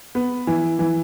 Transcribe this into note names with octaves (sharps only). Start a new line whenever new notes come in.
B3
E3
E3